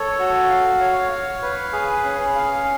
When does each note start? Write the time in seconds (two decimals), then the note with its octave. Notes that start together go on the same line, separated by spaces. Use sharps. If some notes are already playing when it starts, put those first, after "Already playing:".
Already playing: A4 C#5
0.19 F#4
0.49 F5
0.81 C#5
1.11 F5
1.42 B4
1.73 G#4
2.04 C#4
2.35 F5